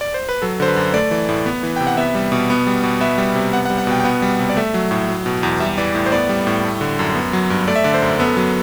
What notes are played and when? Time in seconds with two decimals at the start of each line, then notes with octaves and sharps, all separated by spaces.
0.01 D5
0.14 C5
0.29 B4
0.42 F#3 A4
0.60 D3 C5
0.68 B4
0.76 F#2
0.94 A3 D5
1.11 E3
1.29 A2
1.46 B3
1.63 E3
1.76 C3 G5
1.87 F#5
1.97 B3 E5
2.15 G3
2.32 B2
2.50 B3
2.67 G3
2.83 B2
3.01 B3 E5
3.18 G3
3.35 C3
3.53 B3 F#5
3.65 F#5
3.70 G3
3.78 F#5
3.87 B2 G5
4.00 G5
4.04 B3 F#5
4.22 G3
4.39 C3
4.49 D5
4.57 A3 E5
4.74 F#3
4.91 A2
5.08 F#3
5.26 B2
5.43 E2
5.60 G3 E5
5.78 E3 D5
5.95 A2
6.06 C5
6.12 B3 D5
6.29 G3
6.47 A2
6.64 A3
6.81 D3
6.99 F#2
7.15 B3
7.33 F#3
7.50 G2
7.68 A3 D5
7.76 E5
7.84 D3 D5
7.94 C5
8.02 F#2
8.19 B3 A4
8.37 F#3